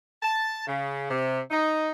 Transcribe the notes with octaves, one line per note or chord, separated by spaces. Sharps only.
A5
C#3
C3
D#4